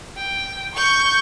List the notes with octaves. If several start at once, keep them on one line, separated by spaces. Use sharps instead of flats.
G5
C#6 G6